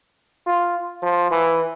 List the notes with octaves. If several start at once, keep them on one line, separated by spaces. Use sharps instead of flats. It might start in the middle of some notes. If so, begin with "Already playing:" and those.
F4
F3
E3